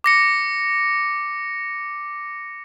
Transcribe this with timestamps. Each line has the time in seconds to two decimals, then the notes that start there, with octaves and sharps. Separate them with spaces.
0.04 D6 A#6 C#7